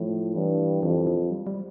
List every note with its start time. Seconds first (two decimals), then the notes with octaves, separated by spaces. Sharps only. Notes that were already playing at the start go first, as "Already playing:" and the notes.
Already playing: A2 F3
0.34 G2 E3
0.83 F2 E3
1.07 F3
1.31 G3
1.47 G3